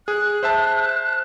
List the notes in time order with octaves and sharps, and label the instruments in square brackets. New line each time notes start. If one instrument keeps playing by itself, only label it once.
[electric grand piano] G#4 [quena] F#6
[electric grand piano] C5 E5 A5